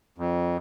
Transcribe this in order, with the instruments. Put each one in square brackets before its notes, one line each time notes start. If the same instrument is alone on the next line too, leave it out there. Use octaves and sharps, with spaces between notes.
[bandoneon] F2